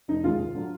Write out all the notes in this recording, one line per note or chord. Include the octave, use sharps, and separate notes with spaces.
F1 D#4
D#2 D#3 G#3 F4
D#2
D3 F#3